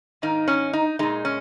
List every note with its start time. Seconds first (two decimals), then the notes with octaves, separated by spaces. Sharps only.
0.22 G#2 D#3 A#3 D#4
0.48 C#4
0.73 D#4
0.99 A#2 G#3 D#4
1.25 C#4